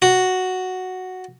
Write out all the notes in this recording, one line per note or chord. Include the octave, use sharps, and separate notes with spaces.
F#4